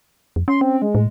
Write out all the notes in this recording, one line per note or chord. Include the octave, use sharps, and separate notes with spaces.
F2
C#4 C6
C4
G#3
A2